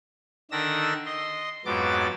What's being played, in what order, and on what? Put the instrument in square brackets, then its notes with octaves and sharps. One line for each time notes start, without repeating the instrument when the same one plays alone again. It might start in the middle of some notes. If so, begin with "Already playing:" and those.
[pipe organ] D3 D#3 D4 E6 A#6
D#5 C6
F2 G#2 F#3 B3 D6 A6